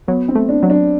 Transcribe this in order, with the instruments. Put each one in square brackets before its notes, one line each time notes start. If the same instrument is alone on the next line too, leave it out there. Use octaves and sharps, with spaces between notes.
[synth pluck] F#3 [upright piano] B3
[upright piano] C4
[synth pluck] A3
[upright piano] D4
[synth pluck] F#3
[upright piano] D4